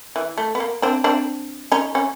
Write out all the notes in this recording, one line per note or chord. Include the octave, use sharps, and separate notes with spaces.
E3
A3
B3
A#3
C4 D4
C4 D4
C#4 D#4
C#4